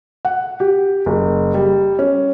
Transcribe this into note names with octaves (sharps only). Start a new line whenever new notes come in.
F#5
G4
F#1
G3
C#4